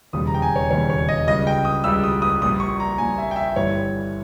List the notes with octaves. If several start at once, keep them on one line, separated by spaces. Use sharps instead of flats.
E1 D#2 C#3 G3 D#6
A#5
G5
G#5
C#5
E1 D#2 C#3 G3 C#5
C#5
D#5
C#2 C#3 G3 D#5
G5
D#6
C#2 C#3 G3 E6
D#6
D#6
A#1 A#2 G3 D#6
C#6
A#5
A#1 A#2 G3 G#5
E5
G5
E5
G1 G2 E3 G3 C#5